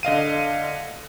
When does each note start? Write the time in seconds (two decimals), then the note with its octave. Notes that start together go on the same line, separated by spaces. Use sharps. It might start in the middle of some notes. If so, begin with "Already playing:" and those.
0.03 D3 D#5 F5 D#7